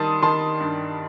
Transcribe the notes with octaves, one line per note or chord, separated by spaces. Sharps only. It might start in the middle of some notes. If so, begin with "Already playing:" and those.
Already playing: D#3 G3 A5 C6 D#6
D#3 A5 C6
G2